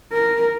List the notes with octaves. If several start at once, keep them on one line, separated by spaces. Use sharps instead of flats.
A#4